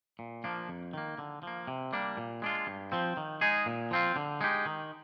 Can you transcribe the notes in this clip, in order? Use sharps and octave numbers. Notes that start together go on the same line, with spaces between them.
A#2
F3 A#3 D4
F2
D#3 A#3
D3
F3 A#3
C3
G3 A#3 D4
A#2
G#3 D4 F4
G2
F3 C4
D#3
G#3 D#4 G#4
A#2
F3 C4 F4
D3
G#3 D#4 G4
D#3